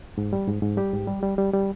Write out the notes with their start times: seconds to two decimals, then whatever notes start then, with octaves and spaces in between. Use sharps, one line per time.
0.18 G#2
0.33 G3
0.47 G#2
0.62 G#2
0.77 G3 G4
0.93 G#2
1.07 G3
1.23 G3
1.38 G3
1.54 G3